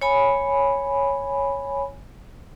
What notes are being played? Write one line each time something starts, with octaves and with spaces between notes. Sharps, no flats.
C#5 G#5 B5